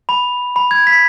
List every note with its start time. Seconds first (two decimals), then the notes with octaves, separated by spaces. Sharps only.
0.09 B5
0.56 B5
0.71 G#6
0.87 B6